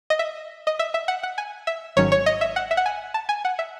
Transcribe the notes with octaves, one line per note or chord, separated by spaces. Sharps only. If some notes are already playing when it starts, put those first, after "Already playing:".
D#5
E5
D#5
E5
E5
F#5
F#5
G#5
E5
G#1 G#2 D#3 F#3 C#4 C#5
C#5
D#5
E5
F#5
E5
F#5
G#5
A5
G#5
F#5
E5